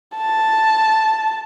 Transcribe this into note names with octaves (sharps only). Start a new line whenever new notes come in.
A5